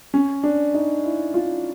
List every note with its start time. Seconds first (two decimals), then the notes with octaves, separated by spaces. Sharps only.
0.14 C#4
0.43 D4
0.74 D#4
1.04 E4
1.34 F4